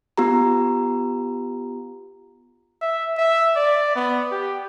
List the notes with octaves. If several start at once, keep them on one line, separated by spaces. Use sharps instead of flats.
B3 F4 G4 A#5
E5
E5
D5
B3
G4